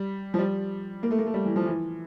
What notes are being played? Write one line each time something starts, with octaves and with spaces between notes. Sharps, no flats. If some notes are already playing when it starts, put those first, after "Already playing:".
Already playing: G3
F3
G3
A#3
A3
A#3
A3
G3
E3
F3
E3